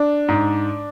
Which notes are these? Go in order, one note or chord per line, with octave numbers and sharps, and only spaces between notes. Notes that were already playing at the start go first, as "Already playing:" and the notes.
Already playing: D4
G#2